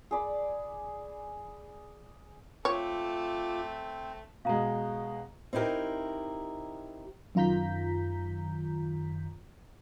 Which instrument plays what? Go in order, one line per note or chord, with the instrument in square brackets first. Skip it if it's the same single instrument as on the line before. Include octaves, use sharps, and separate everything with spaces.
[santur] G#4 D5 B5
[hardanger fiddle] A3 [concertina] C4 [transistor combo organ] F4 D6 [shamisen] C#5
[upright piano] B2 G#3 [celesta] F5 A#5
[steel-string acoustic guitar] C4 D#4 E4 G4 A#4
[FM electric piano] F#2 D#3 F4 A#5 G6 B6